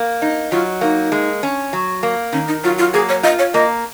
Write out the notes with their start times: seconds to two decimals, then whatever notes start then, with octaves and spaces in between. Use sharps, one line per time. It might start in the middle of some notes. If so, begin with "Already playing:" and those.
Already playing: A#3
0.22 D#4
0.52 F#3 F4
0.81 A#3 D#4
1.12 G#3
1.43 C#4
1.73 F#3
2.03 A#3
2.33 D#3 C#4
2.48 D#4
2.64 F#3 F4
2.78 F4
2.94 A#3 G#4
3.09 C#5
3.23 F4 D#5
3.39 C#5
3.54 A#3 D#5